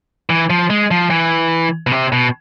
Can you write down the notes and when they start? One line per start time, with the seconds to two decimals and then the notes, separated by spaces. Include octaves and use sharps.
0.30 E3
0.50 F3
0.70 G#3
0.91 F3
1.10 E3
1.87 B2
1.92 C3
2.12 B2